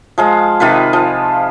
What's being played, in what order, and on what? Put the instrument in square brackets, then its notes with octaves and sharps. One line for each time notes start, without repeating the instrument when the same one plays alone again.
[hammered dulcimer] F3 G#3 F5
C3 D#3 F4 B4
F3